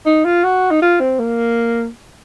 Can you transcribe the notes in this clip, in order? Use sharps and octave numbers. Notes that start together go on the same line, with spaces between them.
D#4
F4
F#4
D#4
F4
C4
A#3